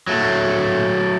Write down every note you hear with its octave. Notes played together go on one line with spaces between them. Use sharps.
F#3 A3